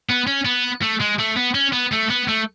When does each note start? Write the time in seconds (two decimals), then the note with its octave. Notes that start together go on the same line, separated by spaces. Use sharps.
0.09 B3
0.27 C#4
0.45 B3
0.82 A3
1.00 G#3
1.19 A3
1.36 B3
1.55 C#4
1.72 B3
1.92 A3
2.09 B3
2.28 A3